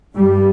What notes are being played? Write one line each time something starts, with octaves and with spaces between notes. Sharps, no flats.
G2 G3